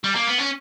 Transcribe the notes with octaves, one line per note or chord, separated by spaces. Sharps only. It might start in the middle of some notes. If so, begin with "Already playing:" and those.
G3
A#3
B3
C#4